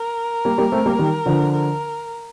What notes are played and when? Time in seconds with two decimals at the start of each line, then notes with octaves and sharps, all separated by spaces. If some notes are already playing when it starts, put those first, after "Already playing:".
Already playing: A#4
0.45 G3 A#3
0.58 G3 A#3
0.72 A3 C4
0.86 G3 A#3
0.99 D#3 G3
1.26 D3 F3
1.53 A#4